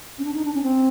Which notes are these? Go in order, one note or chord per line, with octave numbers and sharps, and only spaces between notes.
C#4
D4
D#4
D4
C#4
C4